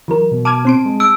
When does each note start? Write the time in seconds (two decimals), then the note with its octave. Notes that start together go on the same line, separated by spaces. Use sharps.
0.08 E3 F#3 A#4
0.31 B2
0.45 A5 D6 F6 G#6
0.65 C4 C6 D7
0.86 G#3
1.00 E6 D7